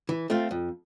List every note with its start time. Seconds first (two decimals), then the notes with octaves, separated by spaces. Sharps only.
0.09 E3
0.30 A3 C4 F4
0.51 F2